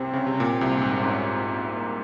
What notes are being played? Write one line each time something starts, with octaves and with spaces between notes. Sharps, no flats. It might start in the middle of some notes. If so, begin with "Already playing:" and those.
Already playing: C2 C3 C4
C#3
C3
A#2
C2 C3
G#2
G#2 C#4
C4
A#3